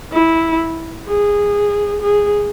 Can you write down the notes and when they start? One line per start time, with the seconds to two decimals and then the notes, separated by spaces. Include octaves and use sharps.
0.13 E4
1.08 G#4
2.01 G#4